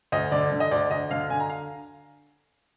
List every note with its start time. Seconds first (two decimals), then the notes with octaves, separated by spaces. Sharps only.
0.12 D2 D#5
0.32 D3 D5
0.52 D3
0.60 D#5
0.71 D2 D5
0.91 D2 D#5
1.10 D3 F5
1.30 D3 G#5
1.40 A#5
1.50 F5